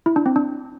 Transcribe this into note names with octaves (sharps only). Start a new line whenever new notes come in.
E4
D4
C4
D4